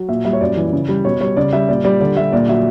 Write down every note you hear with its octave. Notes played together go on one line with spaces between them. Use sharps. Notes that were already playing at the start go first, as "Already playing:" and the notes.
Already playing: F#3
A#2 E5
G3 E5
C#5
F#2 D5
E3
C#3
G3
B2 C#5
G3 C#5
C#3 D5
G3 E5
A#2 D5
G3 D5
D3 D5
G3 E5
A#2 D5
F#3 E5